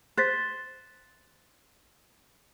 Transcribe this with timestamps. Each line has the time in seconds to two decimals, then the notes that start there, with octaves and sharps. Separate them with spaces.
0.17 C5 F#6 A6 B6